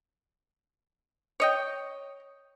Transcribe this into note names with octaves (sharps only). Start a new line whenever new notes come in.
C#5 D#5 G5